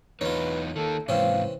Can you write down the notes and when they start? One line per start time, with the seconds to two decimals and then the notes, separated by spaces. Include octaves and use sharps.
0.21 E2 D#4 F4 B4 C#5
0.76 D#3 A#3 A4
1.08 G#2 C3 E3 C4 C#4 F5